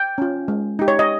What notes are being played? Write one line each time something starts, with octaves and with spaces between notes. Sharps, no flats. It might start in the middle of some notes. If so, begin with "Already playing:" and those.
Already playing: G5
C#4 F4
G#3
D#4 G4
C#5
D#5